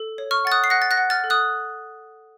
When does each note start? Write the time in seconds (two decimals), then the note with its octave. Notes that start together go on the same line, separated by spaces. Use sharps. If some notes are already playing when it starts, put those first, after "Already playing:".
Already playing: A4
0.18 C#5
0.31 C#6 F6
0.45 F#5 A6
0.52 D#6 F#6
0.64 C7
0.70 F#5 F#6 A#6
0.82 A6
0.91 F#6 A#6
0.97 F#5
1.10 F6 A6
1.24 A4
1.30 D#6 F#6